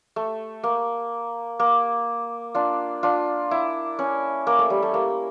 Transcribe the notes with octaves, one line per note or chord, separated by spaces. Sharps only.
A3
A#3
A#3
D4 F4
D4 F4
E4
C#4
A#3
A3
G3
A3
A#3